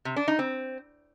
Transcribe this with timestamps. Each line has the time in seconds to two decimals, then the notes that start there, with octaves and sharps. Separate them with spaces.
0.05 C3
0.16 D4
0.28 D#4
0.39 C4